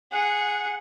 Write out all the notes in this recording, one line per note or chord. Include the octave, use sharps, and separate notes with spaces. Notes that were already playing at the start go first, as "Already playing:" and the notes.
G#4 F#5